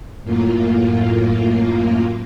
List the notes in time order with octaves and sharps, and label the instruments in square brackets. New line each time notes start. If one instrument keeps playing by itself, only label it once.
[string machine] F#2 A2 A#3 F4